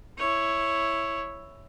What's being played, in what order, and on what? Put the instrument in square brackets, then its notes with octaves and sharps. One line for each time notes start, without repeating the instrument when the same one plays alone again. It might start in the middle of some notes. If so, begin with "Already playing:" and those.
[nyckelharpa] E4 C#5